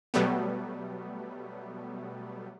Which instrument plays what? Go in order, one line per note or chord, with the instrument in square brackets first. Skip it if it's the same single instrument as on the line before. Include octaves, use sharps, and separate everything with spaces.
[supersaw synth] B2 F#3 G3 A3 B3